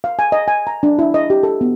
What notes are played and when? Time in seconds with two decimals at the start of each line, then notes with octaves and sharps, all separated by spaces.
0.04 F5
0.19 G#5
0.32 D#5
0.48 G#5
0.67 A#5
0.83 D4
0.99 E4
1.14 D#5
1.30 G4
1.43 A4
1.61 B3